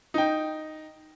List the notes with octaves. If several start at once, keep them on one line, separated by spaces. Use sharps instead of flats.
D#4 G5